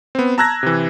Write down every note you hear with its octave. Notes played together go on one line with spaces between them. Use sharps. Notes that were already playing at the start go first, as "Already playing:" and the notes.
B3 C4
A5 A#5 E6 F#6 G#6 A#6
C3 E3